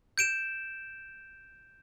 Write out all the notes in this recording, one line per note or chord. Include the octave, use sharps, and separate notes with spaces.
G6 D7 E7